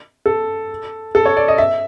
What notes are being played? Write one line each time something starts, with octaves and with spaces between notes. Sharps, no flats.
A4
A4
C#5
D5
D#5
E5